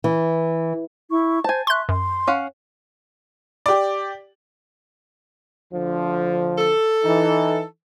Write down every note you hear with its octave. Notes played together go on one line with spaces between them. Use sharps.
E3
E4 C#6
C5 G#5 A5
E5 C6 C#6 F#6
F#2 C6
C#4 F5 F#5
G4 D5
D2 D3 F3
A4
E3 D#4